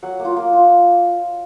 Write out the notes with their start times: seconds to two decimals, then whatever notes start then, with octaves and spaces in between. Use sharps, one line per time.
0.03 F#3 F#5
0.19 A#3
0.25 F4
0.37 A#3
0.53 F4